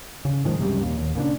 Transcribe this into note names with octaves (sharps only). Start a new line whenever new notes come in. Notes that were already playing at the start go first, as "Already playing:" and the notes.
C#3
G#2 D#3 F3 G#3
C#2 F#2 C3 G3
D#2 A#2
D#2
A#2 C#3 D4